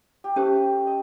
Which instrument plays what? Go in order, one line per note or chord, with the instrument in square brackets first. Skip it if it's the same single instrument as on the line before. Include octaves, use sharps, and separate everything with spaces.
[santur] G4
[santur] A3 [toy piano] C#4 G4 C5
[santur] D#5